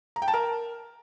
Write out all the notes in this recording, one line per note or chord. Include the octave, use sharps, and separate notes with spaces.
A#5
G5
A5
A#4